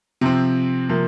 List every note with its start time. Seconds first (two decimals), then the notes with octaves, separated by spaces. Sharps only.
0.21 C3 F3 C4
0.89 C3 F3 A#3